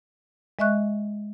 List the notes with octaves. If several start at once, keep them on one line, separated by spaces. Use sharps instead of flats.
G#3 D#5 E5 C#6 F#6